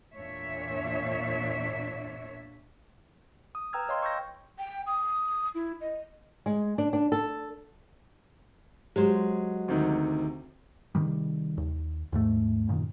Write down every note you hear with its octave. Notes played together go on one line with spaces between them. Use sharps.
E2 A#2 D4 C#5 E5
D#6
B4 G5 A#5 E6 F6 G#6
C#5 D#5 F5 G5 C6
C#6 E6 G6 A#6
G5
D#6
E4
D#5
G#3
D4
D4
A4
F#3 G#3 G4 C5
D2 C3 D#3
C3 D#3 G3
D#2
D#2 G#2 A3
F#2 A#2 D#3